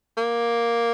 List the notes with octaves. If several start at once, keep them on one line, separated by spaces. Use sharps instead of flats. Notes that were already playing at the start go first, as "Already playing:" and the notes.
A#3